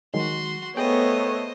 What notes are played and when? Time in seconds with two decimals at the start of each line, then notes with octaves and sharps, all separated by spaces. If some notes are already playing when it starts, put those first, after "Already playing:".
0.14 D#3 F#3 G#3 F#4 C6
0.77 A3 B3 G#4 C5 C#5 D#5 G5